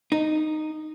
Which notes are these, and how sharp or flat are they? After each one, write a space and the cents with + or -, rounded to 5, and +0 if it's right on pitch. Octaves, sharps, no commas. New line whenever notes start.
D#4 -10